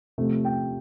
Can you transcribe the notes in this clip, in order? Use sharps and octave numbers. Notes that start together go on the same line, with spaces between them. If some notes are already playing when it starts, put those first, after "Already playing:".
C3 F3 A3
G5